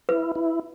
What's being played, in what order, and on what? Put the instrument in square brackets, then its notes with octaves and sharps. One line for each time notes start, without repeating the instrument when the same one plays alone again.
[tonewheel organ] E4 [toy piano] B4
[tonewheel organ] E4